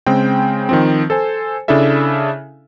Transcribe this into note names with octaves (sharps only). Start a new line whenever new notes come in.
C#3 G#3 C4 G5
D#3 F3 C4
A4 C5 G#5
C#3 D4 E4 A4 E5